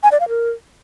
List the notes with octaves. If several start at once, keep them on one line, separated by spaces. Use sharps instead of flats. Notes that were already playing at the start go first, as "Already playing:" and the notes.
G#5
D5
F5
A#4